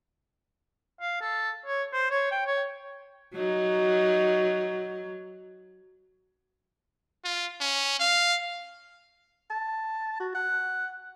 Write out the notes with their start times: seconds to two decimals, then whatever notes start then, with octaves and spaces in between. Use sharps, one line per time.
1.01 F5
1.21 A4
1.66 C#5
1.93 C5
2.11 C#5
2.31 G5
2.47 C#5
3.35 F#3 D#4 F#5
7.24 F4
7.60 C#4
8.00 F5
9.51 A5
10.20 F#4
10.35 F#5